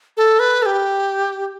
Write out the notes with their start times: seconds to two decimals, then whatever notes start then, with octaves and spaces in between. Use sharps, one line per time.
0.17 A4
0.39 B4
0.62 A4
0.66 G4